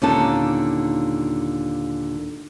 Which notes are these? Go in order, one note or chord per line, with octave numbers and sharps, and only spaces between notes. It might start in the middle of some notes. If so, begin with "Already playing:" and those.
D#2 A#2 D3 C#4 D#4 A5